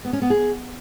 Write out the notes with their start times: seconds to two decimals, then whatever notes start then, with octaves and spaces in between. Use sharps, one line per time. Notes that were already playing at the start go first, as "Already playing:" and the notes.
0.05 B3
0.13 C#4
0.22 B3
0.30 G#4